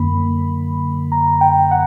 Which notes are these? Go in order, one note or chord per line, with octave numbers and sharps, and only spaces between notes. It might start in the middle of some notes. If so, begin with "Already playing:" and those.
Already playing: F#2 D3 A#3 B5
A#5
G5
F#5